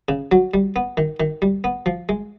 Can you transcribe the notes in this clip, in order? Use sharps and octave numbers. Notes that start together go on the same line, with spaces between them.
C#3
F#3
G3
B3
D#3
D#3
G3
B3
F3
G#3